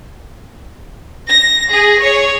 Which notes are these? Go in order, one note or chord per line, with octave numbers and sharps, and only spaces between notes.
A#6
G#4
C#5